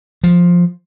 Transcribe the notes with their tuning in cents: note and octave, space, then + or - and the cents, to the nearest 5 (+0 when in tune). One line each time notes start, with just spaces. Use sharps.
F3 +5